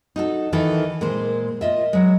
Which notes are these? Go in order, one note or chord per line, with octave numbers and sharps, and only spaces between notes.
D#4 F#4 A4
D#3 E3 E4 A4
A#2 G#3 C5
F4 D#5 E5
F#3 G#3